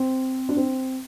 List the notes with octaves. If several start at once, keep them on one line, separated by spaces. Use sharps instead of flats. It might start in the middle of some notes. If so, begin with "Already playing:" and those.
Already playing: C4
D4
C4